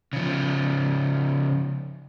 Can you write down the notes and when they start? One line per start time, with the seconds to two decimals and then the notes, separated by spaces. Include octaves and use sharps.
0.13 C#3 F3